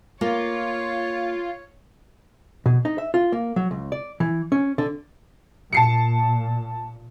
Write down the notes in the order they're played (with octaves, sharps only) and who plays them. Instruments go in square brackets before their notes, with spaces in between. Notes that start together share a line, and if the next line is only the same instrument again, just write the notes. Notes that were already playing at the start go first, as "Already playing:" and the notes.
[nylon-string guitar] A#3 [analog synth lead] F4 [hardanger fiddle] C#5
[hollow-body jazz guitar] B2
D#4
E5
F4
A#3
F#3
C#2
D5
E3
C#4
D3
[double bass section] A#2 [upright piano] A5 C7 C#7